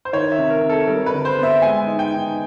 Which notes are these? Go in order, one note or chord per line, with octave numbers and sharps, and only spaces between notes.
C5
D#3 C#5
E5
C3
A#4
C3
A4
G3 A#4
B4
D3
C5
B3
E5
G#3 G#5
D#4
G5
D#4